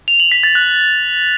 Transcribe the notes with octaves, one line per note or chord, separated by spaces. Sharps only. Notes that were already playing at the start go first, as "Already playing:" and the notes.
F7
F#7
B6
A6
F#6